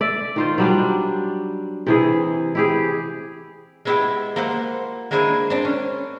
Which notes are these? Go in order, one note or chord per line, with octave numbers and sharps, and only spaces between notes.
D5 E5
D#3 F4 C5
F#3 G3 D4
C3 E3 G#4
E4 G4 G#4
G#3 B3 E4 G4 E5 G5
A#3 F4 C5 E5 F#5
G#3 A#3 D4 E4 C5 G#5
C4 D4
C#4